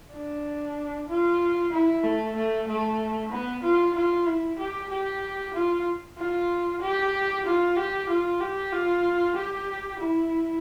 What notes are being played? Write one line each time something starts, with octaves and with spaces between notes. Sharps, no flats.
D4
F4
E4
A3
A3
A3
B3
F4
F4
E4
G4
G4
F4
F4
G4
F4
G4
F4
G4
F4
G4
E4